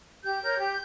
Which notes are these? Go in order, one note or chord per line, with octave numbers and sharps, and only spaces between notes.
G4 G6
A#4 C#5
G4